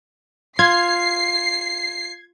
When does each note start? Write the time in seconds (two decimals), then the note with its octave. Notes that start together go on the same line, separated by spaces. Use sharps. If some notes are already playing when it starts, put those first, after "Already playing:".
0.59 F4 G#6 C7